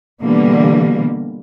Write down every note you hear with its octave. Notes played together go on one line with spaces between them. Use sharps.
B2 D3 E3 G3 A#3